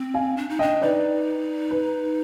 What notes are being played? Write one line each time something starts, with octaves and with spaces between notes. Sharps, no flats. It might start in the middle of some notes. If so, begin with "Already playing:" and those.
Already playing: C4
F5 G#5
D4
D#4
D4 D#5 G5
D#4 B4 D5
B4